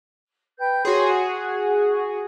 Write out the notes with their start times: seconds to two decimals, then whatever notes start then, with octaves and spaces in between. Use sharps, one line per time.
0.58 B4 G5 G6
0.85 F#4 G#4 C#5 C6
1.08 F#5